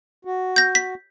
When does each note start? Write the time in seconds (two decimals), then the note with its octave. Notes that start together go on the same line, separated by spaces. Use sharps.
0.25 F#4
0.56 G6 A#6
0.75 B6